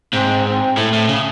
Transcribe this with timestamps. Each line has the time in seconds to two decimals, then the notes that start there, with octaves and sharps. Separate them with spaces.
0.14 G#2 C4
0.46 C4
0.77 A2 A3
0.93 A2
1.09 C#3